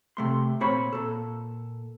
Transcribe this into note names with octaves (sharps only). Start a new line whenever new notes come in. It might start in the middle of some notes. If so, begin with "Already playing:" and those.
C3 A3 C6
A#2 C4 C5 C#5 B5
A#2 A4